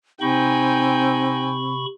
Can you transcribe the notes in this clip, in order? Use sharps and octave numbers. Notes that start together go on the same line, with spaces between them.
C3 C4 D#4 G5 G#5 B5 C#6